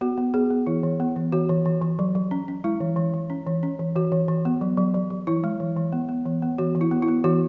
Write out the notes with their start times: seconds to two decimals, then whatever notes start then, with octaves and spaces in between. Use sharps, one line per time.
0.01 B3 F#4
0.18 B3
0.34 B3 G#4
0.51 B3
0.67 E3 E4
0.83 E3
1.00 B3
1.16 E3
1.32 E3 F#4
1.49 E3
1.65 E3
1.82 E3
1.99 F#3
2.15 F#3
2.31 C#4
2.48 C#4
2.64 G#3 E4
2.81 E3
2.96 E3
3.14 E3
3.30 C#4
3.47 E3
3.63 C#4
3.79 E3
3.96 E3 F#4
4.12 E3
4.28 E3
4.45 B3
4.61 F#3
4.77 F#3
4.94 F#3
5.10 F#3
5.27 E3 E4
5.44 G#3
5.60 E3
5.77 E3
5.93 B3
6.09 B3
6.26 E3
6.42 B3
6.58 E3 F#4
6.75 E3
6.81 E4
6.91 B3
7.03 E4
7.08 B3
7.24 E3 F#4